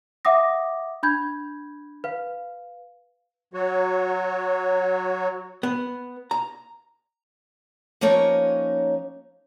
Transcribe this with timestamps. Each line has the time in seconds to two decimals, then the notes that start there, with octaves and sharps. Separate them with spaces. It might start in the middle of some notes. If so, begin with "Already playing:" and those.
0.25 E5 F#5 D6 D#6 A#6
1.03 D4 B5 G6 G#6
2.04 B4 F5
3.54 F#3 F#4 C#5
5.63 B3
6.31 A#5
8.01 F3 A#3 C#4 D#4 C#5